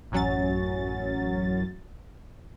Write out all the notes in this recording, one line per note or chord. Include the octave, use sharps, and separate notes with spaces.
A1 F#2 F#3 C#4 A6